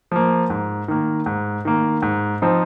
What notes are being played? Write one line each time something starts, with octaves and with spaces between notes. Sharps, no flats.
F3 A#3
G#2
D#3 A#3
G#2
D#3 A#3
G#2
F3 C4 D#4